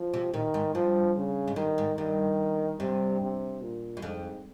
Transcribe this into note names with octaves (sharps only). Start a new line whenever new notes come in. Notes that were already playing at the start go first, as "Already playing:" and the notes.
Already playing: F3
C3
A#2 D#3
G#2
G2 F3
C#3
G#2
G2 D#3
G#2
G2 D#3
G2 C3
C3
A#2
G2
F2 G#2